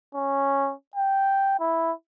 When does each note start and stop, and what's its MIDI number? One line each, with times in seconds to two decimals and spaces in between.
0.15 0.73 61
0.96 1.59 79
1.60 1.92 64